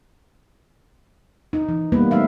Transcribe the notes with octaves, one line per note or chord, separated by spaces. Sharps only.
D#4
E3
G3 A#3 B3 B4
A3 C4 D#4 E5 F5